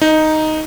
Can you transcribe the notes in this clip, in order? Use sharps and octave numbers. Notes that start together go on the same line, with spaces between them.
D#4